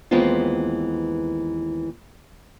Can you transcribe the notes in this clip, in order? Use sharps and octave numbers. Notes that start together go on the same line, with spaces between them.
D#2 E3 G#3 B3 C4 F4